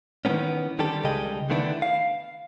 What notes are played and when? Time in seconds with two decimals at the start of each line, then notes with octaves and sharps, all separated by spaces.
0.25 D#3 E3 G3 A#3 B3 C#4
0.79 D3 D#3 G3 G4 A4
1.04 C#2 C#3 G3 G#4 D#5 G5
1.50 D3 D#3 A3 B3 D4 E4
1.82 F5